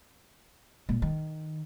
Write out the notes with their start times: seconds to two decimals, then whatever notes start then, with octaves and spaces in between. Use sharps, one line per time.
0.89 A#2
1.02 D#3